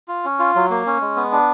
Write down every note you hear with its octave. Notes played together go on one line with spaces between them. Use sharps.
F4
C#4
F4
F#3
A#3
C#4
G#3
B3
D4